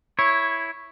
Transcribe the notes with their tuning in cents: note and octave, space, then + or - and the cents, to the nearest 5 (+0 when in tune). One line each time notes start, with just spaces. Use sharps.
E4 +0 C#5 -5